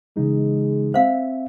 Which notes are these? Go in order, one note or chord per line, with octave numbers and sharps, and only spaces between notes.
C#3 E3 G#3 D#4
C4 C5 E5 F5